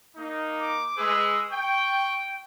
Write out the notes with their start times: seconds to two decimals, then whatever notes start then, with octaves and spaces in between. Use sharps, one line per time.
0.16 A#3 D#4
0.61 D6
0.98 G#3 G#4 B4 E6
1.50 G5 C#6